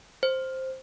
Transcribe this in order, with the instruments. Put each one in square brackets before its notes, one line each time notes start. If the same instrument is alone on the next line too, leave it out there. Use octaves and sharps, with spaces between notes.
[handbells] C5